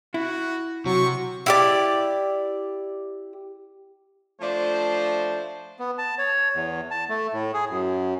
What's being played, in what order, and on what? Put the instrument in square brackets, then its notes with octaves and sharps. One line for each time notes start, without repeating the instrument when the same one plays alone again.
[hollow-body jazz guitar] E4 [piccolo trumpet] F#4
[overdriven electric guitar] C3 [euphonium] F#3 [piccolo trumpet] C#6
[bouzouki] E4 G4 D5
[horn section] F3 A3 D4 C5
[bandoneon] B3
A5
C#5
E2
A5
A3
A2
G#4
F#2